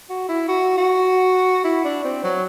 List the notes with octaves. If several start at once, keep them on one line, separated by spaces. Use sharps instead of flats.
F#4
E4
F#4
F#4
E4
D4
C4
F#3